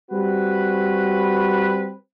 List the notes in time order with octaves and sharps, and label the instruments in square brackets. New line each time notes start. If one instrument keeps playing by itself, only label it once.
[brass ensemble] G3 C4 F#4 B4